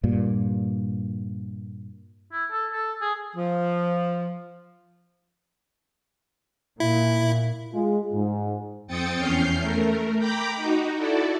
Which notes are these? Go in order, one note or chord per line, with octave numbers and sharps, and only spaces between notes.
G2 A#2
E4
A4
A4
G#4
F3
A#2 E4
G#3 F4
G#2
F2 C4 G5 D#6 A6 C#7
E2 C#4 F6 G6 C7
A3 A#4
G5 A#5 B5 D6 G6
D#4 F#4
E4 F#4 A4 D5